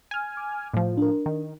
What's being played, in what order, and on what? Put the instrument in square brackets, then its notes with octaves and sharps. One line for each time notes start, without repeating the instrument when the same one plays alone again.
[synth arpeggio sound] G#5 F6
[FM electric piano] D6
[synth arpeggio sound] A2 F3
[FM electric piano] D4 A#4
[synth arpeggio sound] D#3